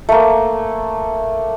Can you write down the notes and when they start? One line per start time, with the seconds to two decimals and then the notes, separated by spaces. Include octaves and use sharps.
0.09 A3 A#3